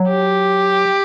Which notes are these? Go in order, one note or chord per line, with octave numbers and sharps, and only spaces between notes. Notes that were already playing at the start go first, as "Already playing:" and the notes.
Already playing: F#3
G4